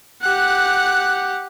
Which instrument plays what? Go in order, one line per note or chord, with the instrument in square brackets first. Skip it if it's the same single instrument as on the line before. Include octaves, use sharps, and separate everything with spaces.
[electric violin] G4 F#5 [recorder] F#6